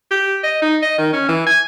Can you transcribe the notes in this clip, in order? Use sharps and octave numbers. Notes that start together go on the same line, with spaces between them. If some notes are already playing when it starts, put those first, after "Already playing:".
G4
D#5
D#4
D#5
D#3
C#4
E3
G#5